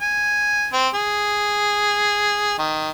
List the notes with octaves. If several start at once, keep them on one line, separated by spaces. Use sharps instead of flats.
G#5
C4
G#4
D#3